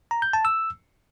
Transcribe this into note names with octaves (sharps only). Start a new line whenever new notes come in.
A#5
G6
A5
E6